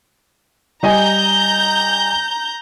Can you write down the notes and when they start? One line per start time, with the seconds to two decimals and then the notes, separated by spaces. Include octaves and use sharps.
0.83 G3 D#5 G#5 A#5 G6